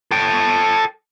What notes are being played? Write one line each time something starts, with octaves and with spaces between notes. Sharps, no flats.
A4 G5